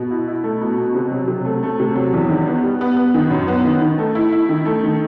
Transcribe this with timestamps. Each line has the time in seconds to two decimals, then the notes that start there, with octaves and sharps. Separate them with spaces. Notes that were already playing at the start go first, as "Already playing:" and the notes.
Already playing: B2
0.11 E4
0.28 E4
0.44 A3
0.61 B2
0.78 B2
0.95 C3
1.11 F#3
1.28 C3
1.45 A3
1.63 A3
1.80 C3
1.95 F#3
2.13 E2
2.29 D#3
2.47 B3
2.63 G3
2.81 B3
2.97 B3
3.14 D#3
3.31 F#2
3.48 B3
3.64 D#3
3.81 D#3
3.98 A3
4.15 E4
4.33 E4
4.49 D#3
4.66 A3
4.83 D#3